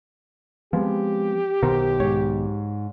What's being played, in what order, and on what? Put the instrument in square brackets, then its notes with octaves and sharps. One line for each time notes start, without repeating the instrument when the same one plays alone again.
[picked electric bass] F3 G#3 [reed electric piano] B3 C4 [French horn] G4
[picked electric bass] B1 B2 D#3 [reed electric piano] A#4 C5
[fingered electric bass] G#2 [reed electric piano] C#5